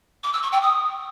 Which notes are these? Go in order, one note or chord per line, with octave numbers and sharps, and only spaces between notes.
D6
E6
C#6
G5
D#6